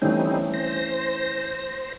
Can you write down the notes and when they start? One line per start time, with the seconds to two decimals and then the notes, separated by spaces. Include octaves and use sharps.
0.02 E3 G3 A3 C4 C#4 D#4
0.54 C5 A#6